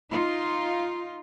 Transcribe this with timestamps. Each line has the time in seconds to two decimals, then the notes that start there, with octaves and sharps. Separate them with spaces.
0.11 D#4 F4